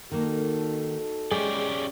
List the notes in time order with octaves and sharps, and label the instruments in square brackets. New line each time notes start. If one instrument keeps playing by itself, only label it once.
[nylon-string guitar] D#3 A#3 [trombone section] D#4 F#4 A4
[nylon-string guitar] G#3 [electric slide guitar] C#4 G4 D5 [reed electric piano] G#4